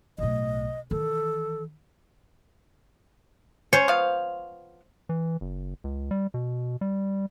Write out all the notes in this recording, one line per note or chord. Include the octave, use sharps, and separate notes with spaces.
B1 A2 D#5
D#3 E3 A4
C#4 C5 C#5
F3 B3 F5
E3
F#1
C#2
G3
B2
G3